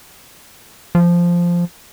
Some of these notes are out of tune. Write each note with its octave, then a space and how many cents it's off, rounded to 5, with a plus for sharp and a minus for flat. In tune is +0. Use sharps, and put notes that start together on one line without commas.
F3 -5